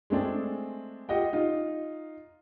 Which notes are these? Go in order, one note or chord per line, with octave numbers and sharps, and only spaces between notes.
G#3 A3 C4 D4 G#4
F4 G4 D#5 F#5 G5
D#4 F4